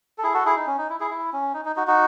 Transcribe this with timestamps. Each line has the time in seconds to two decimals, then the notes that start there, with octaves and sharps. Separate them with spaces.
0.18 A4
0.23 E4 G#4
0.34 F#4 A4
0.46 E4 G#4
0.56 D#4
0.66 C#4
0.78 D#4
0.90 E4
1.00 E4 G#4
1.10 E4
1.33 C#4
1.54 D#4
1.65 D#4
1.76 D#4 F#4
1.87 D#4 F#4